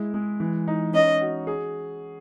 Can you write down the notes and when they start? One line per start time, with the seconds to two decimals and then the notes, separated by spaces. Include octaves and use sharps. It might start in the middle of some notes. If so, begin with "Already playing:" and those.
Already playing: G#3 E4
0.14 G#3
0.40 E3
0.68 D#4
0.93 C#4 D#5
1.21 F#4
1.47 G#4